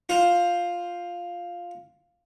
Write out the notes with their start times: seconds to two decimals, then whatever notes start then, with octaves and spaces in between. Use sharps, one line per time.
0.09 F4 C5 F5